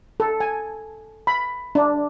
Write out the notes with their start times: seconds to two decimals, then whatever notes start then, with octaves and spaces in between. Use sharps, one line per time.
0.20 A4
0.40 G#5
1.27 B5
1.75 D4